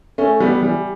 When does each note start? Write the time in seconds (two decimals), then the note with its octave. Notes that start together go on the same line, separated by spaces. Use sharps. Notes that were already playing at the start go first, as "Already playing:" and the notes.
0.18 A3 C#4
0.40 G3 B3
0.61 E3 G3